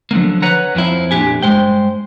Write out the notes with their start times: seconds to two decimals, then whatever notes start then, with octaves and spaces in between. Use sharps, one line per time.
0.11 D3 F3 F#3 A#3
0.42 B4 C#5 F#5 A#5
0.75 F2 F3 C4 E4
1.11 F2 A#2 D4 G4 G#5
1.43 G2 F3 G#3 C5 G5